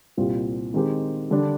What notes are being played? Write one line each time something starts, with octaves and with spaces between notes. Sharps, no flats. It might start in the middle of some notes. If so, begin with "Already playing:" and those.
C2 A#2 G3 C4 F4
D#3 G#3 C4 G4
D3 G3 D4